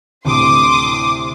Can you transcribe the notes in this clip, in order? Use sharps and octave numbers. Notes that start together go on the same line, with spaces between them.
D2 A2 C3 C6 D6 D#6